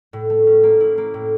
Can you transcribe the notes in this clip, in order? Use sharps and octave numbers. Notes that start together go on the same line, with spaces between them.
A2
A3
C#4
A#3
E4
A#3
A2